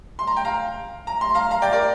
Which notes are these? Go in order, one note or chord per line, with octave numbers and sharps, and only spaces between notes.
C6
A#5
G5
F5 A#5
A#5
C6
F5 A#5
F5 A#5
D5 G5
A#4 D5